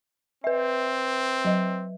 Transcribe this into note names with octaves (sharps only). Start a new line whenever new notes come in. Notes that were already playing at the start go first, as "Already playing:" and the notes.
C4 B4 E5
F#3 D#5